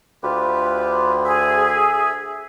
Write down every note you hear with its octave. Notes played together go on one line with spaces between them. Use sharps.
D2 F4 G4 B4
G#4 E5